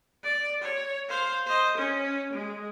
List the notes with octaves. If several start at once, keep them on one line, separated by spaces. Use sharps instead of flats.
D5
C#5
C5 F5
C5 D#5
C#4
G#3